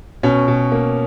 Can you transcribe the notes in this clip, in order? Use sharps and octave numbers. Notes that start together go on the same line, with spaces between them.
B2 C#4
B2
A#3